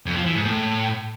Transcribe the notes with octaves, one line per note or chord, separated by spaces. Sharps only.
F2
F3
E3
G#2
A2